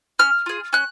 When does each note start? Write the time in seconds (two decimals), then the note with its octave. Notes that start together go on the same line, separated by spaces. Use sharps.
0.19 C#4 F6
0.46 F4 G#4
0.73 C#4 F#6